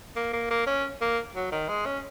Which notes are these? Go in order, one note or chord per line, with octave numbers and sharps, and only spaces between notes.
A#3
A#3
A#3
C#4
A#3
F#3
D#3
G#3
C#4